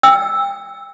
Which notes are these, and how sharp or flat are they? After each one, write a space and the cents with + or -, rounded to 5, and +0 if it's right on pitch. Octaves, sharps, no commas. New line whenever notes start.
G5 +25 E6 +0